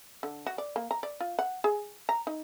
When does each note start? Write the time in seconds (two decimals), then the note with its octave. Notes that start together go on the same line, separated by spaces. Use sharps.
0.23 D3
0.47 F#4
0.58 D5
0.76 A#3
0.91 A#5
1.03 D5
1.20 F4
1.39 F#5
1.64 G#4
2.09 A#5
2.27 D#4